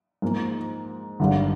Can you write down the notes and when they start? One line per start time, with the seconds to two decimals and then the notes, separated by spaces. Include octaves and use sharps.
0.22 G#2 F3 A#3
1.20 G#1 G2 D3